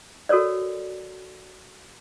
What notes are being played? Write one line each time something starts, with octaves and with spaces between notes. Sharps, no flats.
F#4 A4 A#4 C#5 D5